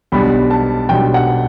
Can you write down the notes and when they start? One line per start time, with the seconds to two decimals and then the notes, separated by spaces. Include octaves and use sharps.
0.12 B1 B2 G3 D4 B5
0.51 A5
0.89 B1 B2 G3 D4 G5
1.14 F#5